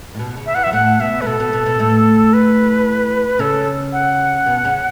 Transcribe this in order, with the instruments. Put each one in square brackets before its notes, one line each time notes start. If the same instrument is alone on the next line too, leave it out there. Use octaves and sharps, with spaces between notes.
[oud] A2
B2
C#3
[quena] E5
[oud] E2 E3 [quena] F#5
[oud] F#3 [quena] E5
[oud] A2 A3 [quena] F#5
[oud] B2 B3 [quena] E5
[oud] A3 [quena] B4
[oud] B2 B3 [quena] A4
[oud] B2 B3
B2 B3
B2 B3
A2 A3
[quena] B4
[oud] C#3 C#4 [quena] A4
[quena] F#5
[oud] B2 B3
C#3 C#4